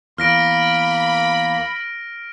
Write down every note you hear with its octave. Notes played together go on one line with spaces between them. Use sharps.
E2 A#3 B5 F6 A#6 D7